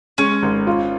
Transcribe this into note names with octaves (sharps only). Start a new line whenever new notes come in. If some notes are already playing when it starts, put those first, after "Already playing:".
G#3 C#4
G#1
F4